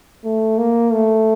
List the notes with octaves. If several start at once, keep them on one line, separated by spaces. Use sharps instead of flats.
A3
A#3
A3